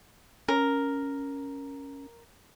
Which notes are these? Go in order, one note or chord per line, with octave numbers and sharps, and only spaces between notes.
C#4 A#4